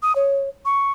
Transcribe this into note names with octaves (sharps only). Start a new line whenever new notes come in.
D#6
C#5
C#6